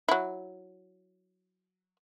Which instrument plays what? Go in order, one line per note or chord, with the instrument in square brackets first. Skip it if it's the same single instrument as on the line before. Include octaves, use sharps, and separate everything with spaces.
[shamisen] F#3 E4